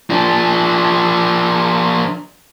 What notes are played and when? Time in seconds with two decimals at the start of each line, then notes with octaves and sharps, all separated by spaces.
0.10 F3 D4